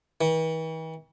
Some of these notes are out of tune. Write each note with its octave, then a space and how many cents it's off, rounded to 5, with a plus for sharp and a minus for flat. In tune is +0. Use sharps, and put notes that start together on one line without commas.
E3 -45